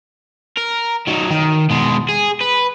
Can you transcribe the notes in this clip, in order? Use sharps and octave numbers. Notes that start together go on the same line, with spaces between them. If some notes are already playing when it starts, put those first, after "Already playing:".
A#4
D#3 F#3
D#3
B2 G#3
G#4
B4